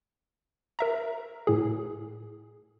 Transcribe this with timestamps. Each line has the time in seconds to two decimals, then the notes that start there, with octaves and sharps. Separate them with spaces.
0.79 A#4 E5 A#5
1.47 A2 G#4